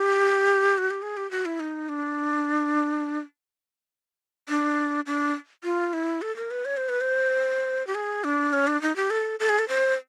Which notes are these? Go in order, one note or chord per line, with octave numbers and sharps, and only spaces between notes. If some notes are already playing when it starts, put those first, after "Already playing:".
Already playing: G4
F#4
G4
G#4
G4
F#4
E4
D#4
D4
D4
D4
F4
E4
A4
A#4
B4
C#5
C5
B4
C5
G4
G#4
D4
C#4
D4
D#4
G4
A4
A4
G#4
A4
C5